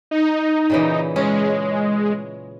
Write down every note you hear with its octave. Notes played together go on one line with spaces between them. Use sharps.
D#4
A#2 C#3 E3
G#3 C#4